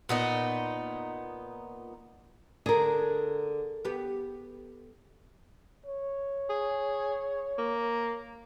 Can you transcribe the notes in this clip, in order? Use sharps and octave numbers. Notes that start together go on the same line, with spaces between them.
A#2 B3 D#4
D3 G#4 A#4
B3 G4
C#5
G#4
A#3